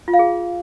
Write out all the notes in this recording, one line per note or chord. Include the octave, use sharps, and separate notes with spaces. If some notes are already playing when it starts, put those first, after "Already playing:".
F4
F5
G#4